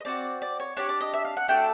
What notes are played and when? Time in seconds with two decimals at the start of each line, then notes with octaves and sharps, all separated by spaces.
0.01 D#5
0.05 C4 D#4 F#4 D5
0.42 D5
0.60 C#5
0.77 D4 G4 C#5
0.89 D5
1.01 D#5
1.14 E5
1.25 F5
1.37 F#5
1.48 A3 D4 F#4 A4 G5